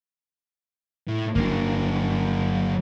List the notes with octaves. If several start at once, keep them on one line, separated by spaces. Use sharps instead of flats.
A2
G1 C#3 F#3 A#3 D4